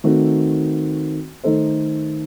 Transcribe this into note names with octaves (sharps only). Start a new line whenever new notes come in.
D#3 A3 C4 F#4
D#3 A3 D#4 A4 C5